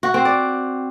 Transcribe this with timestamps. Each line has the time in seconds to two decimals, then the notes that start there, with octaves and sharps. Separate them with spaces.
0.03 F#4
0.14 C4
0.25 D5